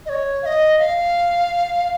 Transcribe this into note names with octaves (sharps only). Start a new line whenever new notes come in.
D#5
C#5
F5
D#5
F5